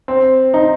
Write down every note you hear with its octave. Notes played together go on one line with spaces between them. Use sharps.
C4
D#4